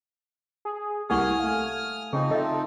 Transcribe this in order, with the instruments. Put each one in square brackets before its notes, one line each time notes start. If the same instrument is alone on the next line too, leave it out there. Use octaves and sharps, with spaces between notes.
[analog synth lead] G#4
[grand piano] C2 A#3 [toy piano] G4 F#5 C#6 [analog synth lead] G#5 [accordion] D#6 F6
[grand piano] A3 F5
[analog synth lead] C#3 [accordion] F3 C4 D#4 [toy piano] G#4
[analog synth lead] A4 [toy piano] D#5 E5